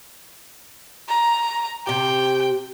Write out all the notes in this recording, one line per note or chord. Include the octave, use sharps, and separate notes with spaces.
A#5
C3 G4 G5